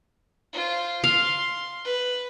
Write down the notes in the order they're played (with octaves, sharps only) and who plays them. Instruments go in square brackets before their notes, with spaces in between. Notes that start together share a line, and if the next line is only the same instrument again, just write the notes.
[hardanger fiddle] F4 C5
[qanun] F5 [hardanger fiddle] C6
[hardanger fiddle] B4